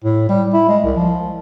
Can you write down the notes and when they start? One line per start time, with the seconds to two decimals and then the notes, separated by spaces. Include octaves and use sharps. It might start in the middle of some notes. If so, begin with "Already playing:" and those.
0.04 A2
0.29 G3
0.53 E4
0.68 G#3
0.83 C2
0.96 F3